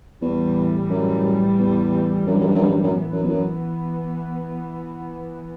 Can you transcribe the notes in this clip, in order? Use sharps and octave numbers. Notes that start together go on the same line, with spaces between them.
E2 A2 E3 G3
F#2
E2
F#2
G2
F#2
G2
F#2
G2
F#2
G2
F#2
E3 B3
F#2
E2
F#2